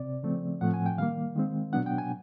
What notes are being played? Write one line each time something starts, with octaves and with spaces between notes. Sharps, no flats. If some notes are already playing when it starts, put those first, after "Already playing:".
Already playing: C3 C4 D5
C#3 F3 A3 C4
A2 F3 A3 C4 F#5
G#5
G5
D#3 G3 A#3 F5
D#3 G#3 C4
B2 F#3 B3 D4 F#5
G5
G#5